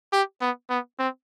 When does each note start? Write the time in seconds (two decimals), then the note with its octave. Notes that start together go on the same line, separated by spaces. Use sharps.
0.13 G4
0.41 B3
0.70 B3
0.99 C4